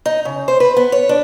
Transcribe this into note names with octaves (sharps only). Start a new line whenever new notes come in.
D#4
C#3
C5
B4
B3
C#5
D4